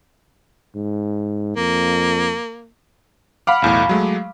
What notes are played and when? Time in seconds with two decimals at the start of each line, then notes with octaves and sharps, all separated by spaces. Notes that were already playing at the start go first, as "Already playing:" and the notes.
0.75 G#2
1.57 F2 A#3
3.47 F5 F#5 B5 D6
3.62 B1 E2 A2
3.89 F#3 G#3 A3